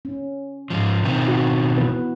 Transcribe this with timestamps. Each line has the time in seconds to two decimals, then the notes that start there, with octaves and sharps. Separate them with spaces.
0.05 C#4
0.70 G#2 F3
1.04 B2 D#3 C4
1.28 F#4
1.77 E3 B3 B4